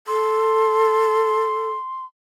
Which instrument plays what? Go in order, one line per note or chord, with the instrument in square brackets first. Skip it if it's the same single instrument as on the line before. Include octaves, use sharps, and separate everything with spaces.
[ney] A4 [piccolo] C6